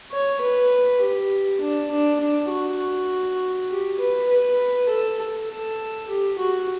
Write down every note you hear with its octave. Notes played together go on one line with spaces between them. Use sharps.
C#5
B4
G4
D4
D4
D4
F#4
G4
B4
B4
A4
A4
G4
F#4